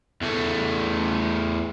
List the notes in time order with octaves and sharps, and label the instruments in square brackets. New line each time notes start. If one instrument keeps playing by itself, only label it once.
[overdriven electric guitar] E2 A3